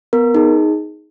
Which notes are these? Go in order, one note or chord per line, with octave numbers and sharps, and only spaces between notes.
B3 A#4
D#4 G#4